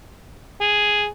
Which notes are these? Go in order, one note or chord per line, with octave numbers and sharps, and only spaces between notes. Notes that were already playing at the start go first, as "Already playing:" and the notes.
G#4